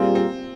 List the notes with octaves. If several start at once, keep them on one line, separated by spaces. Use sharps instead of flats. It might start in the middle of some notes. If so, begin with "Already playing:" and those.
Already playing: A#2 G3 A#3 C4 F4 G#4
C4